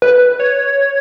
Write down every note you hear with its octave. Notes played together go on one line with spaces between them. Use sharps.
B4
C#5